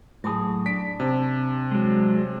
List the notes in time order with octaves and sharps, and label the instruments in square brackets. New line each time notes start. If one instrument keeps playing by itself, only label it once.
[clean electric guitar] A2 G#4 [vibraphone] F#3 A5 D6
[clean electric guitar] D4 [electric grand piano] B6 D7
[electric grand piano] C3 [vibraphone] A5
[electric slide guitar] F#3 G#3